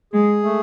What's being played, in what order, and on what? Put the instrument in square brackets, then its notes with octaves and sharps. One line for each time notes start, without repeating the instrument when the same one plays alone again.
[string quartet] G#3 [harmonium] G#4
[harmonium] A3